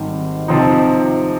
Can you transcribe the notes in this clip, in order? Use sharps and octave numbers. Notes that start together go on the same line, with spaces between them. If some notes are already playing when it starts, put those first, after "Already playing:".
Already playing: G#1 G#2 G3 C4
C3 F3 C4 D#4